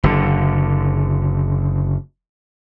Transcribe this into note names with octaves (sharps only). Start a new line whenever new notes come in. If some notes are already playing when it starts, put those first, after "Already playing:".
F#1 D3